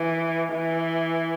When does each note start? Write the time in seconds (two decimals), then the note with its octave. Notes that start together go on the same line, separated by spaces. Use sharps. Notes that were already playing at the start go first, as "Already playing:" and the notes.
Already playing: E3
0.53 E3